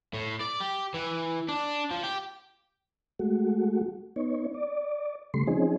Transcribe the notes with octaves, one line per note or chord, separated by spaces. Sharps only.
A2
D5
G4
E3
D4
F3
G4
G#3 A3 F#4
B3 D#4 C#5
D5
C#3 G3 A3 C6
F3 C4 C#4 D#4 G#4